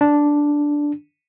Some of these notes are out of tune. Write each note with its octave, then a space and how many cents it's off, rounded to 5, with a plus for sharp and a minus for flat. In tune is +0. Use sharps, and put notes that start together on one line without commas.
D4 -5